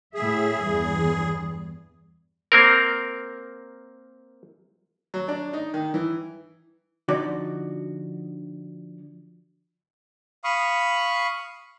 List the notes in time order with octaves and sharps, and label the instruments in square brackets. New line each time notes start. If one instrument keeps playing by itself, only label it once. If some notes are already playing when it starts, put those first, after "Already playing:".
[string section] A2 E5 [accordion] G#4
[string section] E2 G2
[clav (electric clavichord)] A#3 C4 A#4
[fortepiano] F#3
D4
D#4
D#3
E3
[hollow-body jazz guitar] D3 F3 D#4 F#4 D5
[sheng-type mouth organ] F5 B5 C#6 D#6